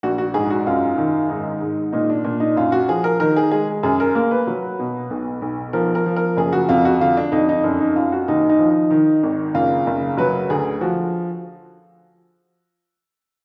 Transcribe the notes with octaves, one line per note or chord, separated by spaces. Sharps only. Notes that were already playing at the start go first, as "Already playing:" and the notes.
A#1 F#4
F#4
G#2 G#4
F#4
F#2 F4
D#3
G#2 D#4
G#2
A#2 D#4
D4
A#2 D4
D#4
F#2 F4
F#4
F3 G#4
A#4
D#3 A#4
G#4
G#3 G#4
F#2 G#4
A#4
A#3 A#4
B4
F#3
B2
B1
B1
F3 A#4
A#4
F3
A#4
F#1 G#4
F#4
F2 F4
F#4
D3 F4
D4
F2 D#4
D#4
F#2 D4
D#4
F#2 F4
F#4
D#2 D#4
D#4
F3
D#4
D#3
G#1
F#1 F4
F#1
F#3 B4
D2 G#4
F3 F#4